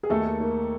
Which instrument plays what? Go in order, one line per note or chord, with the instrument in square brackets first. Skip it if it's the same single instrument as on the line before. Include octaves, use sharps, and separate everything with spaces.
[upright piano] G#4
D#2 A3 A4
A#3
A#3